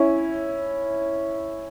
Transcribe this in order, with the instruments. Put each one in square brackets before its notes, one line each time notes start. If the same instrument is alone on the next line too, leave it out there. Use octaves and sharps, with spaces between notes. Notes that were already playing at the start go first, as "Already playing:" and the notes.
Already playing: [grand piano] C#4 E4